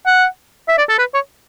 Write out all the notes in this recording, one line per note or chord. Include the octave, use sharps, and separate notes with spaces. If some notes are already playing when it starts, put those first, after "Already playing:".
F#5
E5
D5
A4
B4
C#5